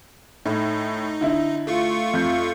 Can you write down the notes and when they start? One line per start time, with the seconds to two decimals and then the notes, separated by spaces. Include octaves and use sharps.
0.46 A2 D#4
1.21 D3 E4
1.67 A3 F4 C#6
2.13 F2 G6